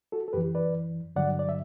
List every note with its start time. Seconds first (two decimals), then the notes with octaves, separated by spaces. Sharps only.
0.12 F#4 A4
0.28 A4
0.33 F#2 E3 G4 B4
0.55 B4 D5
1.16 G2 D3 F#3 D5 F#5
1.39 D5
1.49 E5